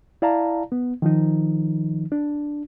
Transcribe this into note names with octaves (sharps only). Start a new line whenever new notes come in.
E4 D5 F5 A5 A#5
B3
D#3 F3 D#4
D4